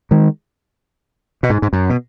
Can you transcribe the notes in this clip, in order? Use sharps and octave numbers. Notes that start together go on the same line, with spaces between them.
D#3 G#3
B2
G#2
G#2
F#2
B2